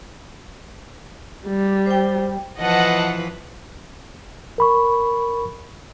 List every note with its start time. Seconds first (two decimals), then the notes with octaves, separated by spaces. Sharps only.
1.48 G3
1.86 C5 G5
2.60 E3 F3 B4 D#5 F#5 A5
4.58 A#4 B5 C#6